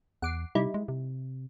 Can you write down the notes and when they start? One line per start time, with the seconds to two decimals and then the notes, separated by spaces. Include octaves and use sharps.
0.22 E2 F#5 D6 C7
0.55 C3 G3 D#4 E4
0.74 G#3
0.88 C3